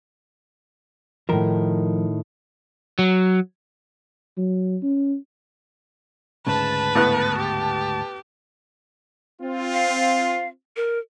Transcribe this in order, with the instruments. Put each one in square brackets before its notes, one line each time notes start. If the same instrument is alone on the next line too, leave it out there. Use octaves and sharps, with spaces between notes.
[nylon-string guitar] A2 D#3 [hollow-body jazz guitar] F3 A#4
[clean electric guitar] F#3
[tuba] F#3
C#4
[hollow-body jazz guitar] D2 G#2 C#3 [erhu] B4 [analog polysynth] A5
[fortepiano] A2 B3 F#6
[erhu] G4
[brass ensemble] C4 F4
[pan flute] F5
A#4